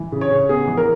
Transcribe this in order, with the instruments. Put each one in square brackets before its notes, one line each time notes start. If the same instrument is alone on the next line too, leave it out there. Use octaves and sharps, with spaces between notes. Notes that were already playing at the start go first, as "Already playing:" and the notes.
Already playing: [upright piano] E3
C#3
C#5
C#3
B3 G#4
E3
A#4